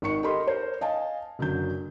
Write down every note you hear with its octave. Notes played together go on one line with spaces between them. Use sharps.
G#1 D#3 C#6 C#7
G4 A4 A#4 D#5 B5 C6
A#4 C5
D#5 F5 G#5 A5
F#1 D3 F#3 G6